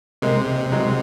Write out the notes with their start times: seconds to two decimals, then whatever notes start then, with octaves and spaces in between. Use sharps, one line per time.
0.22 C3 G#3 A#3
0.72 F#3 G#3